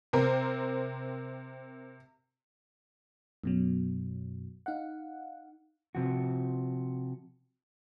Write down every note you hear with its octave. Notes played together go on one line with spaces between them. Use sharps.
C3 C4 A#4
F#2 B2 F#3
D#4 F5 F#5
C3 F3 F#4